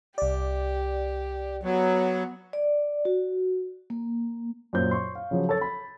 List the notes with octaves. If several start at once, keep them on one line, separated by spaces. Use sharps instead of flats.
C2 G4 D5
F#3 B3
D5
F#4
A#3
F#2 A#2 C5 G6
C6 C#6
F5
C#3 F3 F#3
A4 C#5 A6
B5